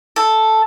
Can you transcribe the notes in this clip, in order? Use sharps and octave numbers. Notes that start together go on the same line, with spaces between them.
A4